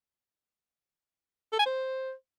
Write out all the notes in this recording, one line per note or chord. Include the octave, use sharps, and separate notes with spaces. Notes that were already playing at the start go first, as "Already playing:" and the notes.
A4
G#5
C5